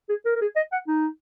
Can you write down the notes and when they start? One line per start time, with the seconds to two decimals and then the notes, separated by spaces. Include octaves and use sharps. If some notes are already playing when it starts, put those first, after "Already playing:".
0.09 G#4
0.25 A#4
0.35 A#4
0.41 G#4
0.56 D#5
0.72 F#5
0.88 D#4